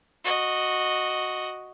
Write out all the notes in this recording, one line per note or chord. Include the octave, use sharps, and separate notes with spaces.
F#4 D#5